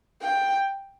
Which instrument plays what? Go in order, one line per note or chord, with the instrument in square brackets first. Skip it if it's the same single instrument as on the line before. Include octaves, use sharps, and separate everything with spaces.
[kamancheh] G5